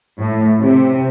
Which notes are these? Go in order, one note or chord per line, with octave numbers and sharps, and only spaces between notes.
A2
C3